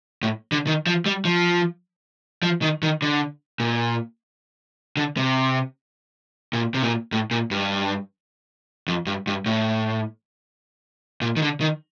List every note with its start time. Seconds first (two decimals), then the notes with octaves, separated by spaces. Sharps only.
0.23 A2
0.52 D3
0.67 D#3
0.87 F3
1.06 G3
1.25 F3
2.43 F3
2.62 D#3
2.83 D#3
3.02 D3
3.60 A#2
4.97 D3
5.17 C3
6.53 A#2
6.74 C3
6.83 A#2
7.12 A2
7.31 A#2
7.51 G2
8.88 F2
9.07 G2
9.27 G2
9.46 A2
11.21 A#2
11.36 D#3
11.42 D3
11.61 D#3